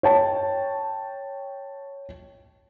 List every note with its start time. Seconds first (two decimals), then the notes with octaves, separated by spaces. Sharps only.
0.03 C#5 G5 A5